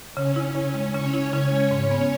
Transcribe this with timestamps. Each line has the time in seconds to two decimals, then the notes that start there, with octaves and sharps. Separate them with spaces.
0.17 C#3 C#4
0.36 E4
0.55 C#3
0.74 G#3
0.94 C#3 C#5
1.13 E4
1.33 C#3
1.52 G#3
1.71 G#2
1.91 B3